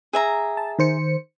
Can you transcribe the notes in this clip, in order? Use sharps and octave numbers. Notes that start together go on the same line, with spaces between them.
G#4 E5 A#5
A5
D#3 C5 C#7